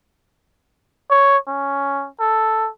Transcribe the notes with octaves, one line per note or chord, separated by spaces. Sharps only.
C#5
C#4
A4